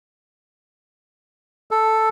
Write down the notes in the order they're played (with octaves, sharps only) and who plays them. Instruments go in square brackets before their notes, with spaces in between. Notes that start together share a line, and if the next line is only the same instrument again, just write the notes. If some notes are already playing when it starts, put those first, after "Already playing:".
[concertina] A4